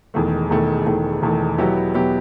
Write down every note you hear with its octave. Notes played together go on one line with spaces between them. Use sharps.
E1 E2 D#3 A3
E1 E2 D#3 A3
E1 E2 D#3 A3
E1 E2 D#3 A3
B2 F#3 B3 E4 G4
B2 F#3 B3 E4 G4